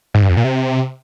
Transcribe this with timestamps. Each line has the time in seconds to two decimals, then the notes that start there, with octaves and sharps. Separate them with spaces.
0.14 G#2
0.22 G2
0.29 F2
0.37 A#2
0.44 C3